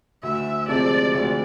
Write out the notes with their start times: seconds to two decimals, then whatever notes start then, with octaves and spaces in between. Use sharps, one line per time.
0.23 D2 E5
0.68 C3 F3 G#3 C4 D5
1.14 D2 D5